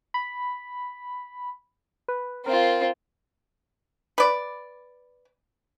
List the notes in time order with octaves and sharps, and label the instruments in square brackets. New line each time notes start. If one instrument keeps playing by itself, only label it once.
[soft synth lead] B5
B4
[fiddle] C4 F4 [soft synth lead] A#4
[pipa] B4 D5